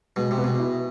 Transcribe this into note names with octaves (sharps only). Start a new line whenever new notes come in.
B2 G#3
C3
B3
B2
E4